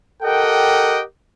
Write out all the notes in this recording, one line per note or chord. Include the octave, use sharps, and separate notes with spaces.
G4 A4 A#4 D#5 F#5 G5